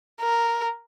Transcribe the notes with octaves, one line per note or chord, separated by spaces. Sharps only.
A#4